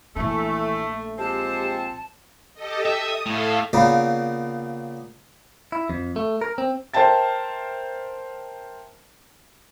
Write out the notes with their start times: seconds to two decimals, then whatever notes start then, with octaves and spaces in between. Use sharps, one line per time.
0.16 A#1 E3 A3 D4
1.18 F3 G#3 C4 G4 A5
2.54 G4 A4 D#5
2.86 E5 D#6
3.26 A2 A4 E5 F5
3.73 A#2 C#3 A#3 B3
5.72 E4
5.90 F2
6.16 A3
6.41 A#4
6.58 C4
6.94 A#4 C5 E5 G5 A5 A6